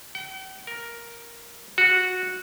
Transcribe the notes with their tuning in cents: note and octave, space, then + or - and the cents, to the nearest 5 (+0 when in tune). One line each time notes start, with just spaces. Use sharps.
G5 -45
A#4 +5
F#4 -10